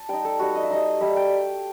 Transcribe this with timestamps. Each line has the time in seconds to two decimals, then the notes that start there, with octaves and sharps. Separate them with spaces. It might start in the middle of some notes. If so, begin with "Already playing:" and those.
Already playing: A5
0.09 G3 D#4 G5
0.25 A4
0.39 G3 D#4 F#4
0.55 D#5
0.63 E5
0.70 G3 D#4 D#5
1.01 G3 D#4 E5
1.16 G5